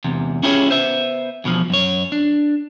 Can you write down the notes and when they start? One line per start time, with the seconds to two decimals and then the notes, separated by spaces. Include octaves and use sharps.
0.04 E2 C3
0.43 C#4 E4 F4 G4 G#4 C#5
0.70 B3 C5 E5
1.44 E2 B2 D3 F3
1.70 F#2 C#5
2.12 D4